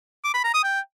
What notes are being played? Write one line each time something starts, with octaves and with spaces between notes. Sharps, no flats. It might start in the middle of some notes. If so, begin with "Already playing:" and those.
D6
B5
A#5
D#6
G5